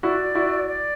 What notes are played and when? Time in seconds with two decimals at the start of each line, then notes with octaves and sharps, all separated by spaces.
0.03 E4 F#4 D5
0.35 E4 F#4
0.68 D5